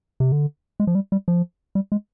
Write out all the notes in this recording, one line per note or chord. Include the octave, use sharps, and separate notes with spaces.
C3
D3
G#3
F3
G3
G3
F3
G3
G#3